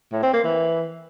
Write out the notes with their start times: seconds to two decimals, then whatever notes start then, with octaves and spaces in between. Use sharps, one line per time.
0.12 A2
0.23 C4
0.33 A#3
0.44 E3